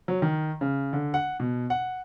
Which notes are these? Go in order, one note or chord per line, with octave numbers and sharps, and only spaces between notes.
F#3
D#3
C#3
D3
F#5
B2
F#5